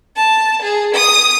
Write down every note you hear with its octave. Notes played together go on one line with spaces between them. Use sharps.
A5
G#4
D#6